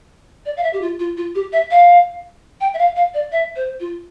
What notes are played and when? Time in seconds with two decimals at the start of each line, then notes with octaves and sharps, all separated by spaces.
0.46 D5
0.57 F5
0.63 E5
0.73 G4
0.82 F4
0.99 F4
1.17 F4
1.35 G4
1.53 E5
1.71 F5
2.61 G5
2.74 E5
2.79 F5
2.96 F5
3.14 D5
3.32 E5
3.56 C5
3.80 F4